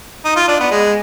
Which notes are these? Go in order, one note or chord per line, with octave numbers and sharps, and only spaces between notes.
D#4
F4
D4
B3
G#3